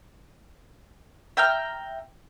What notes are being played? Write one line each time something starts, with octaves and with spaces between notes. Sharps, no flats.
E5 G5 A#5 F6